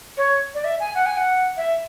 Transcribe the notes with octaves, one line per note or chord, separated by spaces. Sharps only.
C#5
D5
E5
G#5
F#5
G#5
F#5
E5